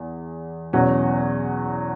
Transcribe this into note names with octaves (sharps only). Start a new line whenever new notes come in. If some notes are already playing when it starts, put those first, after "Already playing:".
Already playing: E2
E2 B2 F#3 C#4 F#4